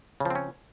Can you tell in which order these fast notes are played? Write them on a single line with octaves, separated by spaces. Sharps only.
C#3 F3 C4 C#4